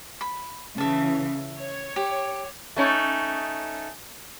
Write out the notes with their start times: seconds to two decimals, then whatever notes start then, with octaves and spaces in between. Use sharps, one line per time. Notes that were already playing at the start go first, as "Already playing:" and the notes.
0.21 B5
0.78 C#3 E3 E5 A5
1.58 C#5
1.96 G4
2.76 A3 C#4 D#4